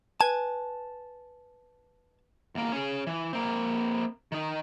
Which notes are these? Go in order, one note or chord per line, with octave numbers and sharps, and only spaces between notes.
B4 G#5 A5 G#6
E2 A#3
C#4 G#4
E3
A#3 C4
D#3 D#4